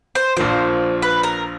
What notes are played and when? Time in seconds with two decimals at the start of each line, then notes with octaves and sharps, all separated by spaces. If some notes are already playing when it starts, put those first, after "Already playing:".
0.15 C5
0.37 A#1 A#2 F3 C5
1.02 B4
1.23 A#4